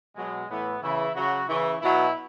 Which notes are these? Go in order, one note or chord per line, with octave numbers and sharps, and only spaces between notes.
B2 F#3 G#3
A2 E3 B3
C#3 E3 E4
C#3 F#3 F#4
C#3 E3 E4
B2 F#3 E4